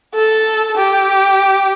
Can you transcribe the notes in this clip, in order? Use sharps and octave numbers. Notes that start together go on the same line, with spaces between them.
A4
G4